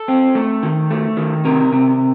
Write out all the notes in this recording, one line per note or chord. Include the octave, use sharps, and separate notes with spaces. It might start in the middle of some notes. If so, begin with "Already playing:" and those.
Already playing: A4
C4
A3
D#3
A3
D#3
C3 A#4
C3